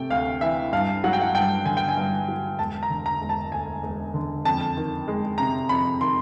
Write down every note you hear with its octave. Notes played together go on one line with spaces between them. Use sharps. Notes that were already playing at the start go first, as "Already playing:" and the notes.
Already playing: C3 A3 G5
D2 F5
E3 E5
G2 F5
F#3 F#5
G5
F#5
G2 G5
D3 G#5
G5
G#5
G2
F#3
E1 A5
A#5
D3
A#5
E1
A5
D2 G#5
E1
D3
F2 A5
D#3
G#3
C3 A#5
F2 B5
D#3 C6